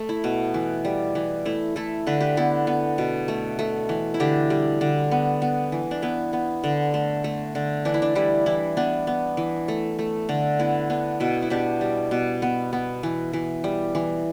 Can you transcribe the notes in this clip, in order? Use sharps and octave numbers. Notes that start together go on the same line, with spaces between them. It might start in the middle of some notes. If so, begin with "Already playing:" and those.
Already playing: A3
E4
B2
E3
G3
E3
A3 E4
A3 E4 A4
D3 B4
G4 B4
B3 E4 A4
B3
B2
A3
A3
E3
E4
D3 D4 G4
G3
D3
B3
B3
E3
D4
B3 E4
B3
D3
A3
A3
D3
E3 D4
E4
D4
G3 E4
E3 E4
B3 D4
B3
E3
A3
A3
D3
B3 E4
B3 D4
B2 E4
E4
B2 D4 G4
G3
B2
B3
B3
E3
E3
G3
E3